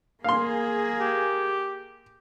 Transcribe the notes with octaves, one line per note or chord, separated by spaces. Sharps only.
A#3 G#4 F5 C6
G4